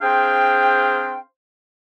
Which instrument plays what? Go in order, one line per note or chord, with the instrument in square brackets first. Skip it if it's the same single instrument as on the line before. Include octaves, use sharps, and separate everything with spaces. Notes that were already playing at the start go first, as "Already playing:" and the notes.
[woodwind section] C4 D4 G#4 C5 F5 G5